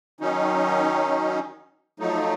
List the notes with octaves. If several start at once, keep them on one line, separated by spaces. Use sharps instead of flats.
D#3 F#3 C#4 D#4
F3 F#3 A3 D#4